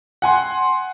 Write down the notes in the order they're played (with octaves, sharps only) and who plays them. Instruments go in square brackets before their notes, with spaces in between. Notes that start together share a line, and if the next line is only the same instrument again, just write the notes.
[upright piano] F#5 G#5 C6